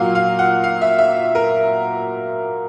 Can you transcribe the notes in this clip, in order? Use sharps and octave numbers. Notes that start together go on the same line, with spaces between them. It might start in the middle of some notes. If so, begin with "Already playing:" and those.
Already playing: A#2 F#3 A#3 F5
F5
F#5
F5
E5
E5
A#4